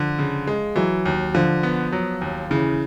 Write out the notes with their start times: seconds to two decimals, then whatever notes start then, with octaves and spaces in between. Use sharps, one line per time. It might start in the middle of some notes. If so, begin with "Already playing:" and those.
Already playing: D3 F3
0.19 C#3
0.47 G#3
0.76 E3 F#3
1.05 D#2
1.35 D3 F3
1.63 B3
1.92 F#3
2.21 D#2
2.50 C#3 E3